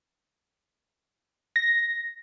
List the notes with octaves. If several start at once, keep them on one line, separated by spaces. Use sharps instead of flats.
A#6